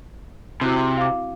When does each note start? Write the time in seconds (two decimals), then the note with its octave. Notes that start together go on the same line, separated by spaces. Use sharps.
0.61 C3 C4 E4 F#4
0.97 F5 D6